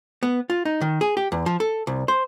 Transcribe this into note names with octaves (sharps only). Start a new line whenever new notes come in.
B3
F4
D#4
D#3
G#4
G4
E2
F3
A4
C2
C5